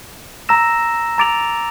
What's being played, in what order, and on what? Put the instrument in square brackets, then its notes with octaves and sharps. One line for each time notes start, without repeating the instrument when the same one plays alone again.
[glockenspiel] A#5 E6 A#6 E7
A#5 D6 A6 D7 F7